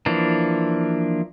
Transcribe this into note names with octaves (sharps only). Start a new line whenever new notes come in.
E3 F3 A#3 D4